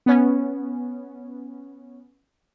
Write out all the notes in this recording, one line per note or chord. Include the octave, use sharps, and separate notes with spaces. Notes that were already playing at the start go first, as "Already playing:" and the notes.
B3 C#4